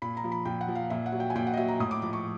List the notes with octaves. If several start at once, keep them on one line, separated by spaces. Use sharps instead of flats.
A#2 B5
A#5
F3
B5
A#2 G5
F#5
F3
F5
A#2 E5
F#5
F#3
G5
G#5
A#2 G5
F#5
D#5
F#3 E5
A#5
A2 D#6
D6
F3 D6
C#6